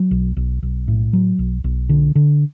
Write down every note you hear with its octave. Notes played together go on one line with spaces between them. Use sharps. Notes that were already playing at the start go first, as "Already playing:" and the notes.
Already playing: F#3
B1
B1
B1
A2
F#3
B1
B1
D3
D3